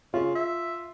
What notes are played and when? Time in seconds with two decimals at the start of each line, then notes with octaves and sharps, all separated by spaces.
0.14 C#3 F4
0.35 E5